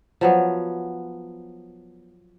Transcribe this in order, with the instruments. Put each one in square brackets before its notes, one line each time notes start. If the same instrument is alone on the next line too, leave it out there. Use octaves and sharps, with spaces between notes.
[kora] F3 F#3 B3